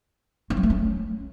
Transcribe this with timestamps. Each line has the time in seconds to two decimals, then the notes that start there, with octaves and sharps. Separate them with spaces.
0.50 C4
0.57 F#3
0.63 A3
0.70 C#4